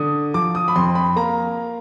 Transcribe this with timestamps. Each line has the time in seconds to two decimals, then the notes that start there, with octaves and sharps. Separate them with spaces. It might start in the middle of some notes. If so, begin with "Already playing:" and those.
Already playing: D3 D#6
0.34 F3 D6
0.55 D#6
0.68 B5
0.76 F2 C6
0.95 B5
1.16 A#3 A#5